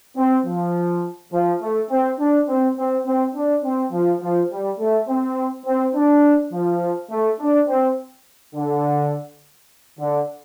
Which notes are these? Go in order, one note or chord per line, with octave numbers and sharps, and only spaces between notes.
C4
F3
F3
A3
C4
D4
C4
C4
C4
D4
C4
F3
F3
G3
A3
C4
C4
D4
F3
A3
D4
C4
D3
D3